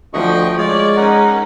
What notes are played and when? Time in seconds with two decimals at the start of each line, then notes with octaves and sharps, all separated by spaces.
0.14 D2 F3 D#5 G5 C#6
0.58 G#3 F4 C#5 D5
0.96 C#4 D#4 A#4 F#5